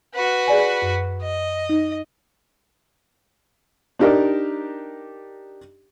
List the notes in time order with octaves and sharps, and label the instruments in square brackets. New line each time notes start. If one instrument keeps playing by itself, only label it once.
[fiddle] F#4 B4
[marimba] G#4 D5 G#5
F#2
[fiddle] D#5
[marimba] D#4
[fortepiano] D4 D#4 G4 A#4 D5